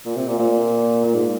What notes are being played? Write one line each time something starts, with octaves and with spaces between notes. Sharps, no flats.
A#2
C3
A#2
A#2
A#2
G#2